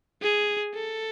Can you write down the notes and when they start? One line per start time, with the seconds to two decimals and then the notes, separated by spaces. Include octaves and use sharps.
0.22 G#4
0.75 A4